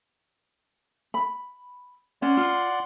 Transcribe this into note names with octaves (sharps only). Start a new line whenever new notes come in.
B5
C#4 D5 F#5 C6
F4